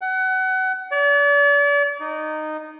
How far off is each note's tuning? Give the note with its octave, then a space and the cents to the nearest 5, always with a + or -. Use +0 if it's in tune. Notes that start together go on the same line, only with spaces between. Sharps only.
F#5 +25
D5 -40
D#4 -15